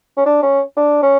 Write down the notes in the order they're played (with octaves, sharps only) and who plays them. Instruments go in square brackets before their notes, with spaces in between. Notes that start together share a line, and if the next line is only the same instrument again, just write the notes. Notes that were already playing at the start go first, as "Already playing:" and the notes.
[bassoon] C#4
D4
C#4
D4
C#4